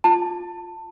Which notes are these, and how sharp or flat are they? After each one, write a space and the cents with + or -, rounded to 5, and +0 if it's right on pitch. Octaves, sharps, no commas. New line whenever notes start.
F4 +10 A5 +20